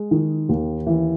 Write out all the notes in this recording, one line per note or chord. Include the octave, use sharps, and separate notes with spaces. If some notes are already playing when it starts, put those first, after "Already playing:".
Already playing: G#3
D#3
D#2
E3